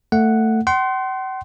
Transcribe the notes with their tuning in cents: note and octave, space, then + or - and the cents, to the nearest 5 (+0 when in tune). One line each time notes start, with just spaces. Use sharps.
A3 +15 F#5 +0
F#5 +45 C6 +0